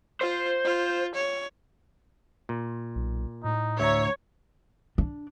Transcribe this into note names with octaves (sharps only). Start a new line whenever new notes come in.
F4 C5
F4
C#5
A#2
B1
A2 D#4
D2 C#5 E5 A#5
D4